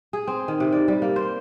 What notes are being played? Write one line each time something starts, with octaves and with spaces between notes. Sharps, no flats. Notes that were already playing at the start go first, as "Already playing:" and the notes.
G#4
C4
D#3
C3
D5
G3
A#3
C5